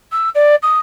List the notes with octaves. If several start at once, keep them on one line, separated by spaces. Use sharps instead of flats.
E6
D5
D#6